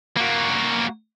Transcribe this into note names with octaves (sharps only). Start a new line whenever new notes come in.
A#3 F#4